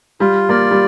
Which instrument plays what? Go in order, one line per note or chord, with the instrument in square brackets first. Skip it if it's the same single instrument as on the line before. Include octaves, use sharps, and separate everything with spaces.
[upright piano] G3 [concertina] F4
[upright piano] A#3 [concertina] D5
[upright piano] G3